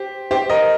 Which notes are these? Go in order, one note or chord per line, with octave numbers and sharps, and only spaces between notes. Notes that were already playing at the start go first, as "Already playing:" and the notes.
Already playing: G4 C5
G4 C5
A#4 D#5